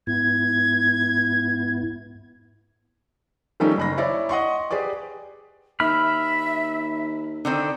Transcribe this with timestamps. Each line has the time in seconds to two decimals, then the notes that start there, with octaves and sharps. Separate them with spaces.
0.07 G#2 B3 E4 G#6
3.60 D#3 F3 G3 A3 C#4 D#4
3.77 F#1 B5 A#6
3.98 E4 C#5 D5
4.29 D#5 F#5 C6 C#6
4.71 G4 G#4 B4 D5 D6
5.80 D#2 E5 B5 F6
7.45 D3 D#3 C4